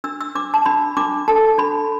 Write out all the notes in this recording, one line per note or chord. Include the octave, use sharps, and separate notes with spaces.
D4 E6
E6
D4 D6
A5
D4 B5
D4 D6
A4 A5
D4 B5